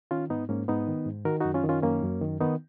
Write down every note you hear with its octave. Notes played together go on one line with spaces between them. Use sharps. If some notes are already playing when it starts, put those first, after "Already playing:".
D#3 C#4 F4
G#2 B3 D#4
G#2 A#3 C#4
G#2 B3 D#4
D#3
G#2
D#3 F#4 A#4
F#2 D#4 F#4
C#4 F4
D#3
C#4 F4
F#2 A#3 C#4
F#2
D#3
D#3 B3 D#4